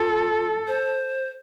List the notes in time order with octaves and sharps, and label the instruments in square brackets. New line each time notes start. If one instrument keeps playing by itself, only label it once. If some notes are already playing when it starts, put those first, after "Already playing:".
Already playing: [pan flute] F4 [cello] A4
[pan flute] C5